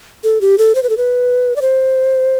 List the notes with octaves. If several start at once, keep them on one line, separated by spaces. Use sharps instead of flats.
A4
G4
A4
C5
B4
A4
B4
D5
C5